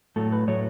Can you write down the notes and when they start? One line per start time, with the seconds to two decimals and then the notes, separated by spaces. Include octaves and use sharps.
0.16 A2 F#3 A3 A4
0.32 B4
0.47 A2 F#3 A3 C#5